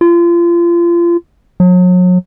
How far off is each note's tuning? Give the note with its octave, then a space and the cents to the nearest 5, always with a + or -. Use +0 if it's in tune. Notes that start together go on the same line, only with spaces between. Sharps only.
F4 -30
F#3 -35